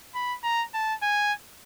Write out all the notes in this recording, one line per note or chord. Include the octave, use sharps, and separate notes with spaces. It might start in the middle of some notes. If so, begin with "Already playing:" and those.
B5
A#5
A5
G#5